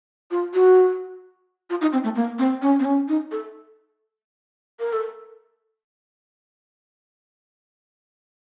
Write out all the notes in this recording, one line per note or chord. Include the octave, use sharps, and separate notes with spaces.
F4
F#4
F4
D#4
C4
A3
A#3
C4
C#4
C4
C#4
D#4
A4
A#4
A4